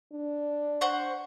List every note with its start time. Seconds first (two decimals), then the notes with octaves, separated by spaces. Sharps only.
0.12 D4
0.81 C5 F#5 C#6